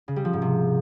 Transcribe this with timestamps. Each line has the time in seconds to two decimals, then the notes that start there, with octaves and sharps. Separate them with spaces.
0.08 C#3
0.16 G3
0.25 F3
0.33 G#2
0.42 C3